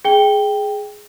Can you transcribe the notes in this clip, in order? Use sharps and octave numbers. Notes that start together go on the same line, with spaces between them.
G#4 G5 G7